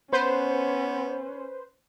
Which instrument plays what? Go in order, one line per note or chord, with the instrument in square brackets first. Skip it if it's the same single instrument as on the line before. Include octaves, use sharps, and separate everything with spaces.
[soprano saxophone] B3 [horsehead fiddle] C#4 [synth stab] B4 C5